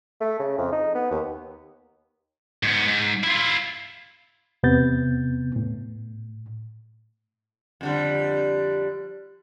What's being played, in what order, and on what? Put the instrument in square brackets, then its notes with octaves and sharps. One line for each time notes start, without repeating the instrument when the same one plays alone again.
[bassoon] A3
C#3
F2
D#4
B3
D#2
[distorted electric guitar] G#2 B3
G#2
E4 F4
[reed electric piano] E2 C3 B3 G6 A6
A2
[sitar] F2 D3 G3